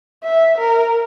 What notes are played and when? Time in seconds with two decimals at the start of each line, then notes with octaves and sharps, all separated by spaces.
0.24 E5
0.58 A#4